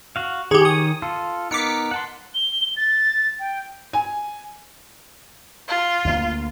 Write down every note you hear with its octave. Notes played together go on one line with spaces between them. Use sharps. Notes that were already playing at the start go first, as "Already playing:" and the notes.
F#4 F5
D#3 G4 G#4 C#5
D#6
F4 A4
B3 D#4 A#4 D6 B6 C#7
F#5 A5 C6
G7
A6
G5
G#5
F4
D2 G3 A#3